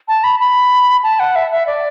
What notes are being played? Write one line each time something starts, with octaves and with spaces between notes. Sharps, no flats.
A5
B5
B5
A5
F#5
E5
E5
D5